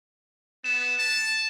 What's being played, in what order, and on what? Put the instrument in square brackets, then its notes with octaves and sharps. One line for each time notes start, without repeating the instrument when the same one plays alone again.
[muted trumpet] B3 [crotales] E7
[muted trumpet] A5